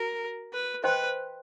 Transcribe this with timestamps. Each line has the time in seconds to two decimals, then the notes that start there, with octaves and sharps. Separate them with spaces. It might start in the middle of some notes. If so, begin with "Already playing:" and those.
Already playing: F#4 A#4
0.53 B4
0.84 B4 C5 D#5 G5 C6